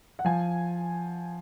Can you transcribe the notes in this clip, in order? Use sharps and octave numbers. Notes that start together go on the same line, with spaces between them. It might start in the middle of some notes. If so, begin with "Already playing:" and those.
F#5
F3 G#5